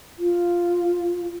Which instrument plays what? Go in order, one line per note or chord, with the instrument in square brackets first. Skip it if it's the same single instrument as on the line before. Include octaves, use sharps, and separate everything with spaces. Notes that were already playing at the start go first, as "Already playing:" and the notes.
[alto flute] F4